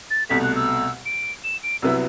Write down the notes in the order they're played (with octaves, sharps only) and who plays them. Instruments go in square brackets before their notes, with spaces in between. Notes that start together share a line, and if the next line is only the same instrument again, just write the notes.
[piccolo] A6
[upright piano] C2 B2 A3 [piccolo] B6
[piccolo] F#6
E6
D7
E7
D7
[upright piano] C2 C3 F#3 B3 E4 [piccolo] E6